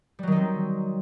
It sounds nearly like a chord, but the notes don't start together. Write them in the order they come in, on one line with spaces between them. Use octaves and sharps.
G3 F#3 D#3 D#4 C4